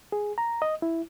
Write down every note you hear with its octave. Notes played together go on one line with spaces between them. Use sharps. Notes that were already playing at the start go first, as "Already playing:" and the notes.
G#4
A#5
D#5
E4